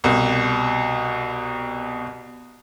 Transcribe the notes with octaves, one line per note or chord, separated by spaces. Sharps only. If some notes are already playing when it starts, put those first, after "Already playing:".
C2 B2